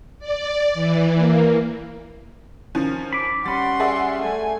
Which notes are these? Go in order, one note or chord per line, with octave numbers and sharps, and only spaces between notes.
D5
E3
A#3
D#3 F3 C#4
B5 D6
G3 C#4 F#5 B5 C6 A6
G#4 D5 E5
A3 G#5